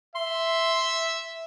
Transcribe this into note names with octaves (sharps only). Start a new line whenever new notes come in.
E5 C6